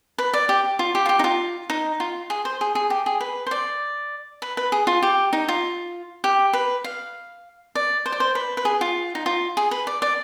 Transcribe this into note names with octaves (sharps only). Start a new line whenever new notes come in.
B4
D5
G4
F4
G4
F4
G4
D#4
F4
D#4
F4
G#4
C5
G#4
G#4
G4
G#4
B4
C5
D5
B4
B4
G#4
F4
G4
D#4
F4
G4
B4
F5
D5
C5
D5
C5
B4
B4
G#4
F4
D#4
F4
G#4
B4
D5
D5